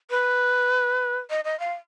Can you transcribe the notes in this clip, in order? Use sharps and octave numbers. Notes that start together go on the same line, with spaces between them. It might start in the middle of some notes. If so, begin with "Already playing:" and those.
B4
D#5
D#5
F5